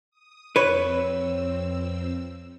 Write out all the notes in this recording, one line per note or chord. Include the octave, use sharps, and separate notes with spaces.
D#6
F2 C4 B4 C#5 E6